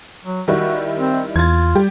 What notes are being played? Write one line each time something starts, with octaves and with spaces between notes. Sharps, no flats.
F#3
D#3 G3 E4 F#4
C4
E2 F4 G#6 A6
G3 G4